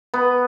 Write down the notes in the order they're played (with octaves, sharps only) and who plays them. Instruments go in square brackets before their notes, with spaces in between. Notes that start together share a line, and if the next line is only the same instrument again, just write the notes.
[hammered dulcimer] B3